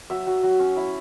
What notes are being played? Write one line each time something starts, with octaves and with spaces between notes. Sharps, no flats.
F#3 E5
F#3
F#3
C#4
E4